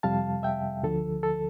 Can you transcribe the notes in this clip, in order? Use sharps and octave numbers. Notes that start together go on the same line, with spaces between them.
F2 C3 G3 F5 A5
E5 G5
D2 D3 F3 A4
A4